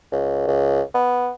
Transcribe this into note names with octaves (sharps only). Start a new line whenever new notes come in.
C#2
C#2
B3